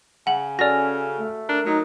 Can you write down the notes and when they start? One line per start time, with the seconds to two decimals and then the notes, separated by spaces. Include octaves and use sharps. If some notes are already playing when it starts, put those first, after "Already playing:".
0.27 C#3 F#5 F#7
0.59 C#4 F#4 A4 D5 F6 A#6
1.19 A3
1.49 D4 A#4
1.66 F#3 D#4